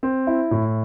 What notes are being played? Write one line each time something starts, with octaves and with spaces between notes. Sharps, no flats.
C4
E4
A2